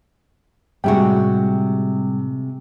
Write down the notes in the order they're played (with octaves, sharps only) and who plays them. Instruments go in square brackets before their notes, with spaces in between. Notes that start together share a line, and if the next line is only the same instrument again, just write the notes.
[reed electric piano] A2 G3 G5 [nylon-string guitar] C3 G#3 F#4